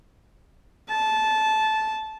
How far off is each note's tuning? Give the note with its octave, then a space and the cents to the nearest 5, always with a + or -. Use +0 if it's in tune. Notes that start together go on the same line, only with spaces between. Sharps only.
A5 -15